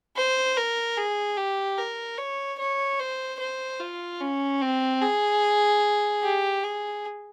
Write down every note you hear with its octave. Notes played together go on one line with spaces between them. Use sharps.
C5
A#4
G#4
G4
A#4
C#5
C#5
C5
C5
F4
C#4
C4
G#4
G4
G#4